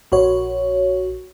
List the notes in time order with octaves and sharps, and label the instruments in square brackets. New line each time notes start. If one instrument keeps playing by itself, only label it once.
[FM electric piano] A#1 F#4 C#5